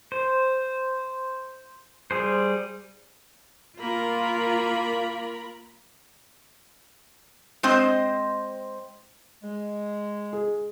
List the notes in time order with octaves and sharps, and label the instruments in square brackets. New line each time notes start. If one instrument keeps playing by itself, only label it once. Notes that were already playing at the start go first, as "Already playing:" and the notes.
[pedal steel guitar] C5
G3 G#4 C5
[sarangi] A#3 [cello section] F4 [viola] A#4 B5
[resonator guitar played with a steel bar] G#3 C4 C5 D#5
[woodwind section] G#3
[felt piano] G#4